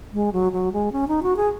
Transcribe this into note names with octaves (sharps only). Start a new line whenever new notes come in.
G#3
F#3
F#3
G#3
C#4
D#4
F#4
G#4